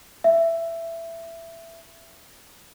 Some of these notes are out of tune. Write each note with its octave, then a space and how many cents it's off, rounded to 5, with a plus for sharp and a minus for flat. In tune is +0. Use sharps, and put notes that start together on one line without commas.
E5 +15